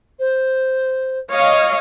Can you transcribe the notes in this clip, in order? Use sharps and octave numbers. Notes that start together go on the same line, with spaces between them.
C5
C#5 D#5 F5